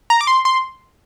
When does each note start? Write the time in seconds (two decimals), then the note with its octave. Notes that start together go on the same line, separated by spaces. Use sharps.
0.10 A#5
0.21 D6
0.27 C6
0.45 C6